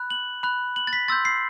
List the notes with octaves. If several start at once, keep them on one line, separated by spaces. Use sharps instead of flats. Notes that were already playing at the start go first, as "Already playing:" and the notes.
Already playing: B5 F#6
F#7
B5 F#6
F#7
A6
B6
C6 E6 G6 A6
C7